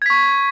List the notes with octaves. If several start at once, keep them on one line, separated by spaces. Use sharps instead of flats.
C#6 G#6 B6